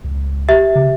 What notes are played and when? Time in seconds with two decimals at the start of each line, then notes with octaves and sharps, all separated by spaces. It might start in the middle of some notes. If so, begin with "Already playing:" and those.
0.04 C#2
0.49 G4 E5
0.75 C#3